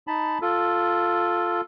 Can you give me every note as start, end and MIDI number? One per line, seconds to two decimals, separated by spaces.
0.07 0.38 63
0.07 0.38 81
0.07 0.38 83
0.42 1.61 65
0.42 1.61 69